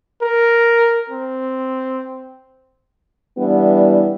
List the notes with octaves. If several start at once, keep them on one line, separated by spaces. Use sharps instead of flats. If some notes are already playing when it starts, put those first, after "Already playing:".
A#4
C4
E3 G3 B3 D4 E4